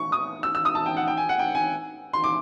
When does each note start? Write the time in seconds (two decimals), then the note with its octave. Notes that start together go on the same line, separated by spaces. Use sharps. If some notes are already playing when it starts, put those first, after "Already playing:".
Already playing: C#6
0.12 D#6
0.43 E6
0.55 E6
0.65 D#6
0.75 A5
0.86 G5
0.97 F#5
1.08 G5
1.17 G#5
1.29 F#5
1.39 G5
1.55 G#5
2.13 C6
2.24 D6